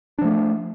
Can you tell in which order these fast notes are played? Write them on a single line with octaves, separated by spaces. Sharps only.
D4 F3 A3